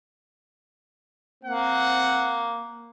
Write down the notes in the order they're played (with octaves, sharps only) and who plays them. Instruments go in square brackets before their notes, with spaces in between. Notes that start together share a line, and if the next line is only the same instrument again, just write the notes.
[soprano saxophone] A#3 [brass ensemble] C4 F#5